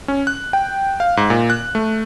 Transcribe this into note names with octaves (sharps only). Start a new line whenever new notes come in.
C#4
F#6
G5
F5
G#2
A#2
F#6
A3